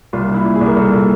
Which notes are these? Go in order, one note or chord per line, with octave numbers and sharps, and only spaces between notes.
C2 F4
A#2
E4
A#2
G#4
C2
A#4
C2 A4
A#2